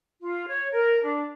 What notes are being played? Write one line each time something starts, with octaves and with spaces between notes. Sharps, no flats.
F4
C#5
A#4
D4